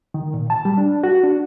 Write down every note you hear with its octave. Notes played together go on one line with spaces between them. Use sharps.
D#3
A#2
A5
G3
D4
F#4
D4